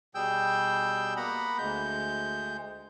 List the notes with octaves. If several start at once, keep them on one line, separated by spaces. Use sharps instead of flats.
B2 G3 G#4 G5 E6 G6
A#3 B3 F#5 A#5 B5
D2 G#3 G6